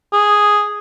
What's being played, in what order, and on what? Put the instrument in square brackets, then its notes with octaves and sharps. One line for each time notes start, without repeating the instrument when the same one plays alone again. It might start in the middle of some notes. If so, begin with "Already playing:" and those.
[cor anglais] G#4